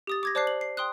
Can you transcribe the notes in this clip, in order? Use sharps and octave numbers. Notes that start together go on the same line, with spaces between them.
G4 D#6 A6
D6 G#6 A#6
C5 D5 A5 D6 F#6 C7
F#7
C7
G5 C6 D#6 F#6